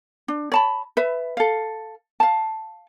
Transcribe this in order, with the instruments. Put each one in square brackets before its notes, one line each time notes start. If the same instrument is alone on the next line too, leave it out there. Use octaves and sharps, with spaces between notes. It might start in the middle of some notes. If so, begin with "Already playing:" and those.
[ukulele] D4
C#5 A5 B5
B4 E5
A4 F5
F5 A5